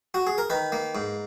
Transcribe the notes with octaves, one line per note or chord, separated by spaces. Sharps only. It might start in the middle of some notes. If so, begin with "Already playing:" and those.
F#4
G#4
A#4
D#3 B4
A#3
G#2